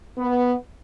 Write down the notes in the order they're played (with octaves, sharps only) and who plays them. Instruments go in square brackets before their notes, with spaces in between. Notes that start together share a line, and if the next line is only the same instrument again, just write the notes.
[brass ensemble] B3